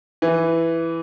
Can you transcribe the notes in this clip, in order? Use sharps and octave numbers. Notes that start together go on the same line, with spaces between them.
E3